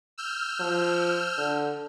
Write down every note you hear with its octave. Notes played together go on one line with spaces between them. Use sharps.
E6 F6 G6
F3
D3